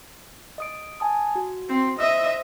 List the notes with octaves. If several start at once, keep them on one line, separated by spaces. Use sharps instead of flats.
D#5 D#6 D7
G#5 A5 D#6
F#4
C4
C5 D#5 E5 D#6 E6